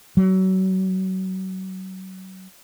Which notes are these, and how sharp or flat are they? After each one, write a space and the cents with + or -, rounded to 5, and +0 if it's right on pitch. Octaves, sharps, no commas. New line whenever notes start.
F#3 +30